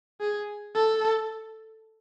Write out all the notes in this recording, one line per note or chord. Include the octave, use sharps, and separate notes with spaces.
G#4
A4